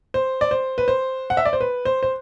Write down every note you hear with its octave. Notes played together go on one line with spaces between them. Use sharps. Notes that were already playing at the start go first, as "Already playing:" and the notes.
C5
D5
C5
B4
C5
F#5
E5
D5
C5
B4
C5
C5